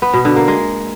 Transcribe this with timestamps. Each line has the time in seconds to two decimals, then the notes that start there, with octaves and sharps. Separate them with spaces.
0.02 B3
0.14 B2
0.25 D3
0.36 A#3
0.48 G#3